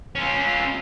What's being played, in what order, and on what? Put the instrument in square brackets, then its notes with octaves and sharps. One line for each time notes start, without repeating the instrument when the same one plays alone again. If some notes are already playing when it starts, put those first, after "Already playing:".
[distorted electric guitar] C#4 F4